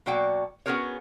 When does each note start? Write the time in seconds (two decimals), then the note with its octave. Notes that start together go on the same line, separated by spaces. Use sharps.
0.06 B2 F#3 A#3 F#4 D5 G5
0.66 B3 C#4 F#4 G#4 A#4 C#5